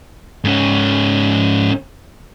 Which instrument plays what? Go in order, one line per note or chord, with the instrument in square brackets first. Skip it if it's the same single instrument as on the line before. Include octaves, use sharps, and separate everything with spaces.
[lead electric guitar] G#2 C#4